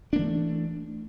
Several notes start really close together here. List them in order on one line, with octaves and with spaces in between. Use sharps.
D4 A#3 E3 A3